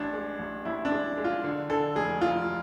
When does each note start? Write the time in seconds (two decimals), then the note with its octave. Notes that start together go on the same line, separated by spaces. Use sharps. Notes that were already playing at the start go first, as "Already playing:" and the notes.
Already playing: A1 D4
0.14 G#3
0.39 A1
0.65 A1 E4
0.85 D4
0.92 G#3
1.17 G#3
1.24 F4
1.44 D3
1.70 D3 A4
1.96 F1 G#4
2.21 F1 F4